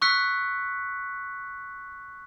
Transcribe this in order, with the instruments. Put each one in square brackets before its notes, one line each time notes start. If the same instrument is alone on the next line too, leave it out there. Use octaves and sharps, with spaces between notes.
[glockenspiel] C#6 E6 F#6 B6 C#7